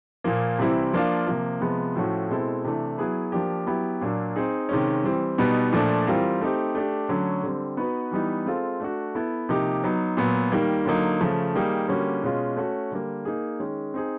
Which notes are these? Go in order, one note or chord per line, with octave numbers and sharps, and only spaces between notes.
A#2 F3 A#3
C3 E3 G3 C4 E4
F3 A#3 D4 F4
C3 F3 A#3
C3 F3 G#3 B3
A2 F3 A3 C#4 F#4
B2 G#3 C4 E4 A4
C3 E3 A3 D4
F#3 B3 E4 G#4 B4
F3 A#3 D4 G4
F#3 B3 E4 G4
A#2 F#3 A#3 D4
C4 D#4 G#4
C3 D#3 G#3 C#4
E3 G3 C4
B2 G3 B3 D#4
A#2 F3 A3 D4
E3 G3 C4 F4 A#4
A3 C4 D#4 G4
A3 D4 G4
D3 F#3 A3 C#4
D3 G3 C4
B3 D#4 F#4 B4
E3 G3 B3 D#4
G#3 C4 F4 A4
A3 D4 F#4
B3 E4 A4
C3 F3 A#3 D#4 G4
F#3 B3 D#4
A#2 F#3 B3
D#3 G3 A#3
D3 F#3 A#3 D#4
C#3 F3 A3
D#3 G3 A#3 D#4 G#4
D3 G3 A#3 C#4 F#4
B2 G#3 C#4 F4
A3 C#4 F#4
D3 G3 A#3
A#3 D#4 G#4
D#3 G#3 C#4
C4 D#4 G#4